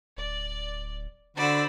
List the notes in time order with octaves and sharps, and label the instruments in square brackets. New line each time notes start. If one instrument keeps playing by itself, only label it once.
[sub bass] D1 [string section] D5
[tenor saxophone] D3 [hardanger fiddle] F#4 D5 [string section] C5 B5 E6